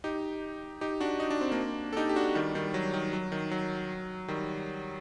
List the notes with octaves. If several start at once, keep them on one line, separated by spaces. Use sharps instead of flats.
D#4 G4
D#4 G4
D4 F#4
D#4
D4
C4
A#3 D4
A4
D#4 G4
G4
D4 F#4
D#3 G3
D#3 G3
F#3
D#3
F#3
D#3
F#3
D#3 G3